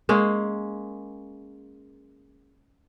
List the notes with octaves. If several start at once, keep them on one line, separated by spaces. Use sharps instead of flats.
G#3 A#3 C#4